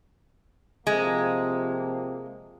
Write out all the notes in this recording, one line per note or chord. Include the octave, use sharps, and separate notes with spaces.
C3 F3 G#3 A#3